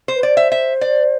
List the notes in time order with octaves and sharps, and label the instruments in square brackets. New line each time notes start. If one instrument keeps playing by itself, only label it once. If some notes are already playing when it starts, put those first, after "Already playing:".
[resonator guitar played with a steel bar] C5
[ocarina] B4
[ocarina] C5 [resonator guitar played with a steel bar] D5
[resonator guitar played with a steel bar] E5
E5
D5